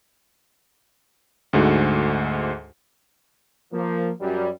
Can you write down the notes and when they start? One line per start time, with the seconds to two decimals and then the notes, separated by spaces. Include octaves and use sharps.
1.53 D2 G#2 D3 F#4
3.72 F3 A#3
4.20 F#2 G3